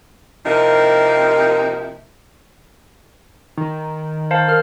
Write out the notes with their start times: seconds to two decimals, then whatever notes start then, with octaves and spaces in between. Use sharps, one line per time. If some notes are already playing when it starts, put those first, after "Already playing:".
0.46 C3 F3 A#3 D#4 E4 A#4
3.57 D#3
4.31 C5 F5 A5
4.48 A#4 F6